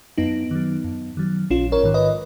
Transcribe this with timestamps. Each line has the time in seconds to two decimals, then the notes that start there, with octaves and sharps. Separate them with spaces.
0.18 F#2 B3 D#4
0.51 D#3 F#3
0.84 F#2
1.17 D#3 F#3
1.50 A#1 C#4 F4
1.72 A#4 C#5
1.83 G#2 D#3
1.94 B4 D#5